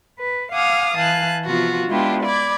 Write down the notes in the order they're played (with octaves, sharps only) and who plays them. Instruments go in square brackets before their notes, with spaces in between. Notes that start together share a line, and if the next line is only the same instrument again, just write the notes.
[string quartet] B4
F5 F#5 G#5 D6 D#6 F6
E3 F5 G#5 A5 F#6
C3 F3 B3 F4 F#4
G#3 B3 D4 E4 F4 G4
D5 B5 D6 G#6